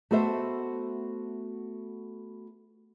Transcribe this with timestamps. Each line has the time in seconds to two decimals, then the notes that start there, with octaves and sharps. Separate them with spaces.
0.11 A3 B3 F#4 A4 C5 E5